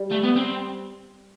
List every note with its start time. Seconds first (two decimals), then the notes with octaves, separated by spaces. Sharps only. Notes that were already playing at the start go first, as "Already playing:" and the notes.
Already playing: G3
0.11 A3
0.23 B3
0.36 C4